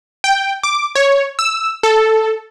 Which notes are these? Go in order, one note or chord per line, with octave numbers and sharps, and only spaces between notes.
G5
D6
C#5
E6
A4